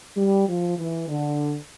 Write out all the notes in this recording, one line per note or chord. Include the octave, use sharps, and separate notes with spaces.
G3
F3
E3
D3